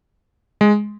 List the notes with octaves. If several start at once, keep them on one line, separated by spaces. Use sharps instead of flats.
G#3